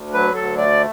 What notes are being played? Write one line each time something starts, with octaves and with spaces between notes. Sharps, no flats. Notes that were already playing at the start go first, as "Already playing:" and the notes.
Already playing: D2
F#3 B4
D2 A4
A3 D5